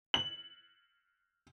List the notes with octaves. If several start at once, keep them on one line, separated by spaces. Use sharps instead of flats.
F#7